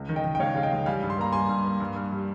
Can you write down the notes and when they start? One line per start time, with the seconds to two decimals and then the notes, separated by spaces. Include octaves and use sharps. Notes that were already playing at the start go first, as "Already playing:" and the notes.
Already playing: C#2
0.09 D#3
0.16 D#5 G5
0.24 D#3
0.35 G5
0.40 C#2 C#5 F5
0.55 G#3 F5
0.63 D#5 G5
0.72 C#2
0.86 G3 F5 G#5
1.03 G2
1.10 C6
1.18 A#3 A#5
1.32 G2 G#5 C6
1.49 G2
1.65 A#3
1.80 G2
1.96 G2
2.12 G3